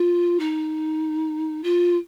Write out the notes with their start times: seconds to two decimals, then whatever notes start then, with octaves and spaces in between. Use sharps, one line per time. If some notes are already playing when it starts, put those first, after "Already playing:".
Already playing: F4
0.39 D#4
1.63 F4